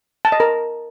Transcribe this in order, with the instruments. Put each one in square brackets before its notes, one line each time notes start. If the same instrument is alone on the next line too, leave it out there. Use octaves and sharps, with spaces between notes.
[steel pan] A5
D#5
A#4